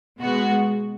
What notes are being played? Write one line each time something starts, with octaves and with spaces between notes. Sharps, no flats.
B2 G#3 B3 F#4